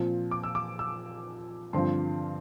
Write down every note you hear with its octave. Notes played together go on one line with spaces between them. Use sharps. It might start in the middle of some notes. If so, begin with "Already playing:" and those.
Already playing: A#2 F3 C4
D6
E6
D6
E6
G2 D3 F3 C4 C6